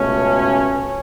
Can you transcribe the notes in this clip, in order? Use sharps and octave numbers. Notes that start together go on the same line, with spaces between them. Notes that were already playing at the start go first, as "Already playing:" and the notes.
Already playing: C#2 B2 A3 C#4